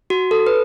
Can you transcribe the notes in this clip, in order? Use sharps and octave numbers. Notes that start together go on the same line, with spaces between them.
F#4
A4
B4